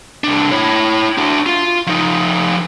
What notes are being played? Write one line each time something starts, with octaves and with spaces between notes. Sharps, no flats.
C2 D4
E4 C#5
D4 F#4
F4
F3 D#4